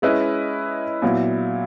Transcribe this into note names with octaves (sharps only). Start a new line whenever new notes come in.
G#3 C#4 E4 B4 D#5
A#2 F#3 B3 E4